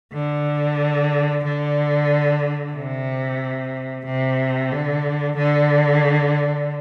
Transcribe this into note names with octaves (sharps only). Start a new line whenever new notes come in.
D3
D3
C3
C3
D3
D3